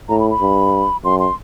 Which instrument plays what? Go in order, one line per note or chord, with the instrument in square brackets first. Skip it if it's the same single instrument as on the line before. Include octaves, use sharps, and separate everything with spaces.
[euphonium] A2 [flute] A#5
[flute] B5
B5
[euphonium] G2
[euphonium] F#2 [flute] C6
[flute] C6